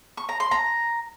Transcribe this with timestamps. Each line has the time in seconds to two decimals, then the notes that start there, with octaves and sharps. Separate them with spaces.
0.17 C#6
0.29 A#5
0.40 C6
0.51 A#5